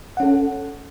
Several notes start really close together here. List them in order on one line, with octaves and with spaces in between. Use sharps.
F#5 C#4 A4